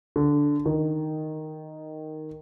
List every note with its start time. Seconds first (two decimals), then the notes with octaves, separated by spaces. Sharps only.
0.16 D3
0.66 D#3